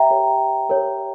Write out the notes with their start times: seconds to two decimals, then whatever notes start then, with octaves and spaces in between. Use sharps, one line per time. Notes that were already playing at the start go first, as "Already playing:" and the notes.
Already playing: G4 C#5 E5 G5 A#5
0.10 G4 A#4 C#5
0.69 G4 A#4 C#5